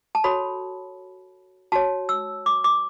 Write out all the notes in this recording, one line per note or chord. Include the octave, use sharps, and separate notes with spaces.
A5
F#4 A4 C#5 B5
F#4 C#5 A5
E6
D6
D6